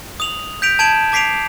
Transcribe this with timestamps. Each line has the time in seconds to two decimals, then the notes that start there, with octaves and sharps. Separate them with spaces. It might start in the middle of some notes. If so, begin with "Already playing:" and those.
0.20 D#6 F7 F#7
0.62 G6 B6 D7 F7
0.79 A5 G#6 D7 E7 F#7
1.12 A5 D6 B6 C7 D7 F7